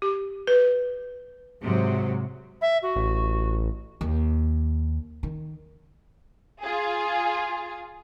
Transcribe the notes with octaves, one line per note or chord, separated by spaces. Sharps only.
G4
B4
G#2 C3 F#3
E5
F#4
A1
D#2
D#3
F4 G#4